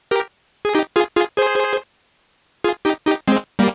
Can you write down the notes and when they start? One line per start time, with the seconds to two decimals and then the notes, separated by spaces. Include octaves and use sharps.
0.11 G4 A#4
0.65 G#4
0.75 D#4 G4
0.96 F4 G#4
1.16 F4 G#4
1.38 G#4 C5
2.64 F4 G#4
2.85 D#4 G4
3.07 D#4 G4
3.28 G#3 C4
3.59 G3 A#3